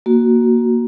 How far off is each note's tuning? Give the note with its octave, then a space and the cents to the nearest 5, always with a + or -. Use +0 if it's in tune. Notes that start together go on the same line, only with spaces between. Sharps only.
A#3 +10 F#4 +0